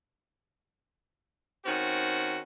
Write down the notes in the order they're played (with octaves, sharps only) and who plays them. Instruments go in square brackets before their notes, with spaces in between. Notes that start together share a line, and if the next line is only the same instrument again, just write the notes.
[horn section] D#3 C4 C#4 F#4